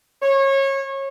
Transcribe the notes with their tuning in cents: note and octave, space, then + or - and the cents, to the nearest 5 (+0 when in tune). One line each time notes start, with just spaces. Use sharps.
C#5 -25